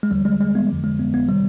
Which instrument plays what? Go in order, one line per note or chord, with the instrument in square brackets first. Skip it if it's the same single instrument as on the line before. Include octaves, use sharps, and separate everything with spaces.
[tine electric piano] G#3
D#2 D3 F3 G3
G#3
G#3
B3
F2 D3 F3
G#3
B3
B3
C3 D#3 G3